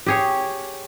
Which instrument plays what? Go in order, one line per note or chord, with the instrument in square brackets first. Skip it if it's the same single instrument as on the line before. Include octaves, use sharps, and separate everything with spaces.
[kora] G4 G#4 C#5